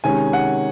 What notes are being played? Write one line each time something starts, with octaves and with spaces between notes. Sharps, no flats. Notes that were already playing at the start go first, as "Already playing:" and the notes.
C3 D#3 G#3 C#4 G#5
F#5